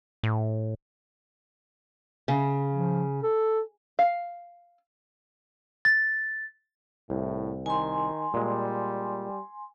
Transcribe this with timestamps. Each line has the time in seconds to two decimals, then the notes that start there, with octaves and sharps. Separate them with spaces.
0.23 A2
2.28 C#3
2.72 F3
3.23 A4
3.99 F5
5.85 A6
7.10 C2 A2
7.66 D#3 G#5 C6
8.34 A#2 G3 G#3